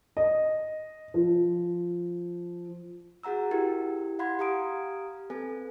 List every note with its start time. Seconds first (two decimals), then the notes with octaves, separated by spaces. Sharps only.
0.17 D#5
1.14 F3
3.23 F#4 G#4 F#5 A#5 E6
3.51 E4 G4 A#4
4.19 F5 F#5 B5 C6 G#6
4.39 G4 F5 A#5 D#6 D7
5.30 C4 A4 B4 G#5